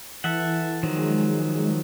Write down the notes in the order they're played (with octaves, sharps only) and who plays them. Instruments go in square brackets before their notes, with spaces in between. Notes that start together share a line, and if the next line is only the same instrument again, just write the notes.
[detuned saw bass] E3 [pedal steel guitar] A4 E5 F#5
[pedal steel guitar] D#3 F3 F#3
[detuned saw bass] G#3